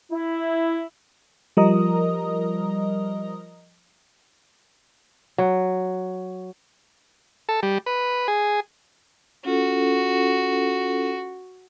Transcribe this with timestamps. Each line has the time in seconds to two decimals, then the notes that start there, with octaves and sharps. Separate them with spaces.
0.12 E4
1.57 F3 G3 A#4 D#5 A#5 D#6
5.38 F#3
7.49 A4
7.63 G3
7.86 B4
8.28 G#4
9.45 C#4 F4 F#4 A4